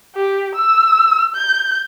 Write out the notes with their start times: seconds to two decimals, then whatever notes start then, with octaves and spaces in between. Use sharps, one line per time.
0.16 G4
0.55 E6
1.35 G6